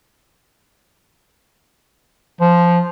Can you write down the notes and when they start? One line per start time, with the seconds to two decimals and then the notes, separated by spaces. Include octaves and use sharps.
2.41 F3